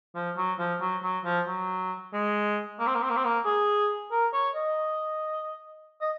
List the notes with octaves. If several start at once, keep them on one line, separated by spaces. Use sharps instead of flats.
F3
F#3
F3
F#3
F#3
F3
F#3
G#3
A#3
C4
A#3
C4
A#3
C4
A#3
G#4
A#4
C#5
D#5
D#5